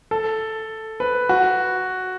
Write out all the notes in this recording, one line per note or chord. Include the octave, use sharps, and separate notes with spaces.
A4
B4
F#4